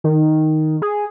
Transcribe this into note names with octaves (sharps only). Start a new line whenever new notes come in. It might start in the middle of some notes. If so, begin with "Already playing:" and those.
D#3
G#4